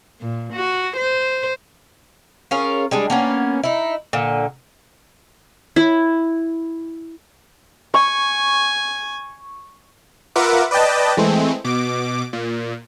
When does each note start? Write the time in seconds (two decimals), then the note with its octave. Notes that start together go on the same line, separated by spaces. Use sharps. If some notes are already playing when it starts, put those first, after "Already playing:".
0.21 A#2
0.53 F#4
0.97 C5
2.51 C#4 F4 G#4 A#4
2.91 G3 G#3 D4
3.10 A#3 B3 C#4
3.64 D#4 E4
4.13 A#2 D3
5.76 E4
7.94 G#5 C#6
10.36 F4 A#4 B4 E5 F#5 D6
10.71 B4 D5 D#5 G5 A5
11.17 E3 G#3 A3 C4
11.64 B2 D6
12.33 A#2